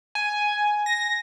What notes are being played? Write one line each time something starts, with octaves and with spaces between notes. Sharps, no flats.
G#5
A#6